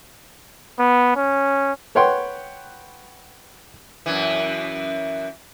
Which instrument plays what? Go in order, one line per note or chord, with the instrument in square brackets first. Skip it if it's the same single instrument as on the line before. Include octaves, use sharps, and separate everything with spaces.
[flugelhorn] B3
C#4
[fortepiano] B4 C#5 F#5 G5 C6
[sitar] F#2 E3